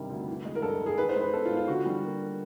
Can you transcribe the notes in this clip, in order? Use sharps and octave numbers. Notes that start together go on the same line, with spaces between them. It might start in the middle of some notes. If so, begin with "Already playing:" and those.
Already playing: G2 C3 D#3 G3
D2
E3
G#3
A#4
G2 A4
G2
G#4
D#3 B4
C5
G#3
B4
B3 A4
F4
G#2
F4
D3 F#4
G3
A#3